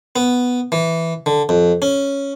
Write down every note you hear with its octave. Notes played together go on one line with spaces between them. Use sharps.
B3
E3
D3
F2
C#4